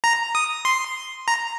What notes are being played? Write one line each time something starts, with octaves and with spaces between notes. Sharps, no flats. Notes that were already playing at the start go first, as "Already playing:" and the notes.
A#5
D#6
C6
A#5